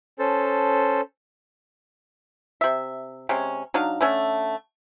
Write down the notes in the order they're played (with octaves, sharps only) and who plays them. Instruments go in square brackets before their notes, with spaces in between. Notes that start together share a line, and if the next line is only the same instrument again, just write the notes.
[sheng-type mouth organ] C#4 A4 C5 A5
[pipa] C3 E5
C3 G#3 C#4
F#3 D4 D#4 F5
D3 A3 C#4 E5